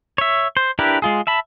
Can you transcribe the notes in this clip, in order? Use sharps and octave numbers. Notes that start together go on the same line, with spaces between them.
C#5 E5
C5
D4 E4 G4 A#4 B4
G#3 F4 G#4
E5 A5 B5